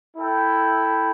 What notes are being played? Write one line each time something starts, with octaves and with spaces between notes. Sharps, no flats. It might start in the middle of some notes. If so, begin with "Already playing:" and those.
E4 A4 G5